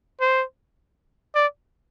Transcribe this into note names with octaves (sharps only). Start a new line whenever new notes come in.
C5
D5